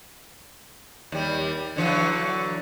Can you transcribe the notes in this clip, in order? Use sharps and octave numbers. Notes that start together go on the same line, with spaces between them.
D#2 G3
D3 E3 F#3